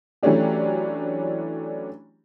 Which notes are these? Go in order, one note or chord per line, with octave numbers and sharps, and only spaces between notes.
E3 F#3 A3 C#4 D4 G4